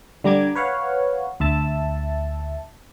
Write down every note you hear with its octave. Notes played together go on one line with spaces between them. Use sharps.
D3 G3 A#5 D6 G#6
B4 C#5 F5 F#5
D2 E5 A5